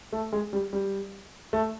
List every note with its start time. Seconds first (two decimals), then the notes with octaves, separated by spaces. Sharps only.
0.13 A3
0.32 G#3
0.53 G3
0.73 G3
1.53 A3